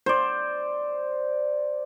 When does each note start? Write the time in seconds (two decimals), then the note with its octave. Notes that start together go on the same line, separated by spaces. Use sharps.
0.06 C5 D5